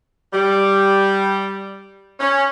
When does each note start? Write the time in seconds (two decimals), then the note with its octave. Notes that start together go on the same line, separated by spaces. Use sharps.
0.32 G3
2.20 C#4